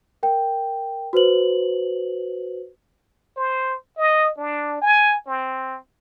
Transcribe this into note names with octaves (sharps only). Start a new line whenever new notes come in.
A#4 G5
F#4 B4 C5 F#7
C5
D#5
D4
G#5
C4